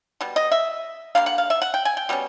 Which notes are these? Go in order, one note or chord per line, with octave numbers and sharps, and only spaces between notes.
B2 G3
D#5
E5
D3 G3 A#3 F5
F#5
F5
E5
F#5
G5
G#5
G5
B2 G3 A#3 C#4